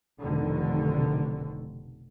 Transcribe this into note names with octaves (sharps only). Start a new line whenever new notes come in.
F1 B1 D3 D#3